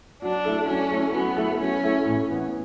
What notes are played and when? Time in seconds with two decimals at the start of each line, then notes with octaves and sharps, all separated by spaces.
0.22 F#3 D4
0.45 A3 E4 A4
0.68 F#3 C#4
0.90 A3 E4 A4
1.14 F#3 B3
1.37 A3 E4 A4
1.59 F#3 C#4
1.83 A3 E4 A4
2.05 A2
2.28 E3 B3